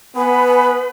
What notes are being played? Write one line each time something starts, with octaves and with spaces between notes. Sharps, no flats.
B3 B4 G#5